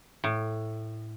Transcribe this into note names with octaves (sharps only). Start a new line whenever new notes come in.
A2